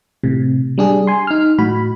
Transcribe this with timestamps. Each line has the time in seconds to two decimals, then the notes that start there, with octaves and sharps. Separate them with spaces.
0.23 A2 C3
0.78 G3 D4 G#4
1.07 G#5 C6
1.27 D#4 F6
1.59 A2 F#4 B5